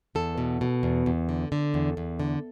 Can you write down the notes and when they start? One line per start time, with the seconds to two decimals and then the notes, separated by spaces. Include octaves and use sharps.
0.15 E2 A4
0.38 B2
0.61 B2
0.83 E2
1.06 E2
1.29 D3
1.52 D3
1.74 E2
1.97 E2
2.20 D3